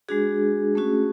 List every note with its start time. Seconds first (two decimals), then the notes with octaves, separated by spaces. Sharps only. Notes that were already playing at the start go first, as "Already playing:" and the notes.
0.09 G#3 D4 F#4 G#4
0.75 A3 C#4 F#4